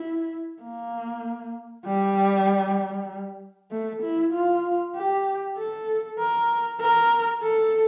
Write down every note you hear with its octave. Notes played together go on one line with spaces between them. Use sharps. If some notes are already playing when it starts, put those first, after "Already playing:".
Already playing: E4
A#3
G3
A3
E4
F4
G4
A4
A#4
A#4
A4